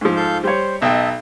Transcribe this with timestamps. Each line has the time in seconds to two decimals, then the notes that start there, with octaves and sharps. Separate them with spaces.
0.01 G#2 F3
0.17 A4 F5 G6
0.44 G3 C5 C#5
0.82 B1 D#5 E5 G5 A5